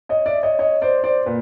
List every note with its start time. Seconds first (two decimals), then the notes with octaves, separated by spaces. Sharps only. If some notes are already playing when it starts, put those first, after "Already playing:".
0.09 C#5 D#5
0.26 D5 E5
0.43 C#5 D#5
0.59 C#5 D#5
0.82 C5 D5
1.04 C5 D5
1.26 A#2 B4